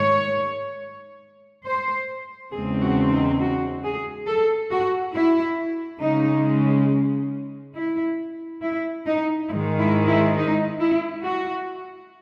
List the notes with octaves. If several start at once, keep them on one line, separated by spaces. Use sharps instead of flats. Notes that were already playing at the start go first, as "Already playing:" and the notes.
Already playing: G#2 D#3 G#3 C#5
C5
E2 C#3 G#3 C4 G#4
F#4
D#4
F#4
G#4
A4
F#4
E4
C#3 G#3 C#4 D#4
E4
E4
D#4
G#2 D#3 G#3 E4
E4
E4
D#4
E4
F#4